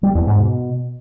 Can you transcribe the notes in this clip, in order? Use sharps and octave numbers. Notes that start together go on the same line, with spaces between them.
G3
E2
G#2
B2